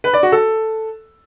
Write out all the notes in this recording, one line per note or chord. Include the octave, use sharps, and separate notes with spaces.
B4
D5
F#4
A4